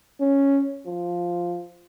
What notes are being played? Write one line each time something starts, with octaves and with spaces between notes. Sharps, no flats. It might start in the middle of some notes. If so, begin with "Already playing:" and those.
C#4
F3